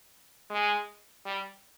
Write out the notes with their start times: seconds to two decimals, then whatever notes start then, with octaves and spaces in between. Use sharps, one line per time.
0.51 G#3
1.25 G3